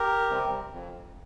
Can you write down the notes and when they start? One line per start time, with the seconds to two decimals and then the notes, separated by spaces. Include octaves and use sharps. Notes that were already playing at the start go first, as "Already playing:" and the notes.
Already playing: G4 A#4
0.30 C3 G3 C4
0.73 F2